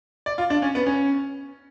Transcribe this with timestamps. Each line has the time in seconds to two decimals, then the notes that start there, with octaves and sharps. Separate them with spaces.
0.26 D5
0.38 F4
0.50 D4
0.62 C#4
0.75 B3
0.86 C#4